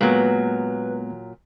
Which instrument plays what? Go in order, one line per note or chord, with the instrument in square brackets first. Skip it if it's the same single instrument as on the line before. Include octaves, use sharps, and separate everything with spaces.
[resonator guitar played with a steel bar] A#2 F#3 [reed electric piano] G#3 A#3 B3 [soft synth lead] B4